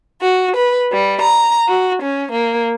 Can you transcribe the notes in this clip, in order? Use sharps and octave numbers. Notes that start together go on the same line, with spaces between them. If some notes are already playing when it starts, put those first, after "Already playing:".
F#4
B4
G3
A#5
F#4
C#4
A#3